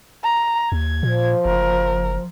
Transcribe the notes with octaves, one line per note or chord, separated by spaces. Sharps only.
A#5
D#2 G#6
A#2 F3
F#1 A#4